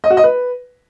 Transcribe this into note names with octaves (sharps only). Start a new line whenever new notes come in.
D#5
F#4
D#5
B4